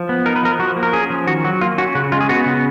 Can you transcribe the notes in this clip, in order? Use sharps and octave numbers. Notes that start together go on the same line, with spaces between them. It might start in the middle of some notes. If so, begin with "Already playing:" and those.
Already playing: F3
B3
D#4 A#4
B4
F3 A#4
F3 F#4
A#3
A#4
C#4 G#4
F3
D#3 F#4
F#3 F#4
A#3 F4
C#4 F#4
C#3 F#4
G#3 F4
G#4
B3 F#4
C#3